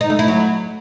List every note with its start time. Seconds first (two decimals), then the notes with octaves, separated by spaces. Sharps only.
0.01 D#4
0.10 A3
0.19 E4
0.28 F#3